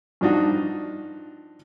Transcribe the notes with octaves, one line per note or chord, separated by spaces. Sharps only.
G2 F3 D4 D#4 F#4